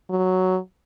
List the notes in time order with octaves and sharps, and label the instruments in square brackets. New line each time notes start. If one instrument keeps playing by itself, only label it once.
[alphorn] F#3